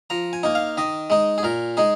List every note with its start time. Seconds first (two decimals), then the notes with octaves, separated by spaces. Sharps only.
0.10 F3 A#5
0.33 G#5
0.43 A#3 D#4
0.55 F5
0.77 D#3 D#5
1.10 G#3 D#4
1.38 G#4
1.43 A#2 A#4
1.77 G#3 D#4 G#4